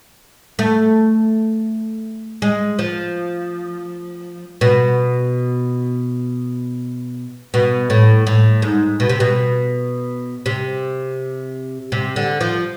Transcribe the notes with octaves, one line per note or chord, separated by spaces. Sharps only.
A3
G#3
F3
B2
B2
A2
A2
G#2
B2
C3
B2
C3
C3
D3
F3